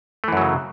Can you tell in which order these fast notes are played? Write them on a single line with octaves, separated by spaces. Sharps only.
A3 E3 F#2 F#3 C#3